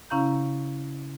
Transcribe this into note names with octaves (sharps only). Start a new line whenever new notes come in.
C#3 C#4 E4 F5 A#5 G6